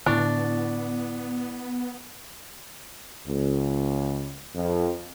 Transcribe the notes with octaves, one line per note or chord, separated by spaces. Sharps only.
A2 D3 B3 D4 E4 C#6
C#2
F2